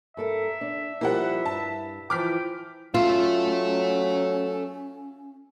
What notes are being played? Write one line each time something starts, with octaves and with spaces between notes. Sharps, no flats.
G2 A4 A#4 E5
D4
F3 G3 A#3 E4 G4 F#5
G2 A5
E3 F3 G5 D6 F6 B6
F#3 C#4 F4 A4 E5